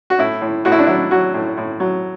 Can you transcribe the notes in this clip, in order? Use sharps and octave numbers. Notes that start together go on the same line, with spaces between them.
F#4
A2 E4
A2
A2 F#4
E4
D4
F#3 E4
F#3 F#4
A2
A2
F#3